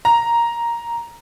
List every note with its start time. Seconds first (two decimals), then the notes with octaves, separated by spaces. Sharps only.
0.05 A#5